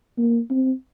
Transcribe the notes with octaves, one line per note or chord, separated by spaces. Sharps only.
A#3
C4